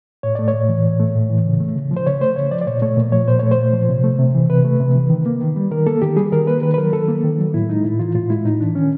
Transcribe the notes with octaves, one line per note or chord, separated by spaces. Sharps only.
A2 C#5
A3 D5
C#5
A2
E3
A2
A3
A2
E3
C#3
A3
C#3
F3
C5
C#3 C#5
A3 C5
C#3 C#5
F3 D5
D5
A#2 C#5
A3 C#5
A#2
F3 C#5
A#2 C5
A3 C#5
C5
A#2
F3
C3
A3
C3
E3
C3 B4
A3
C3
E3
D#3
A#3
D#3
G3
D#3 A#4
A#3 A4
D#3 G4
G3 G#4
D#3 A#4
A#3 B4
D#3 B4
B4
F#3 A#4
D#3 A4
A#3
D#3
F#3
A2 E4
G#3 D#4
A2 E4
E3 F4
A2 F4
G#3 E4
A2 D#4
E3 D4
D#3 C#4